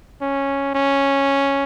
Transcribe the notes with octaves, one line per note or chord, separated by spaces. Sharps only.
C#4
C#4